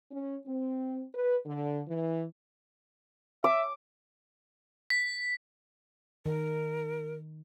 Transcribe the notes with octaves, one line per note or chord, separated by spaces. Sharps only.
C#4
C4
B4
D3
E3
E5 D6
B6
D#3 A#4